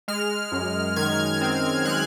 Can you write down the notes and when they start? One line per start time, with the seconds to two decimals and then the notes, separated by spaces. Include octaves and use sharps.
0.08 G#3 F6
0.52 F#2
0.96 D#3 G#6
1.41 C4
1.85 G#3 F#6